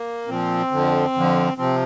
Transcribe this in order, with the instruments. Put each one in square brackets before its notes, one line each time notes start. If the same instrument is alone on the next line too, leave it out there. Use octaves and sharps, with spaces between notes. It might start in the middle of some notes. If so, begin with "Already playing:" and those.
Already playing: [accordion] A#3
A#2 F3 C4
F2 D3 F3
F2 D3 F3
C3 F3 C4